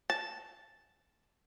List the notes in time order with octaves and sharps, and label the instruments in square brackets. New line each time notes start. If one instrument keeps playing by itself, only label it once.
[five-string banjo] A5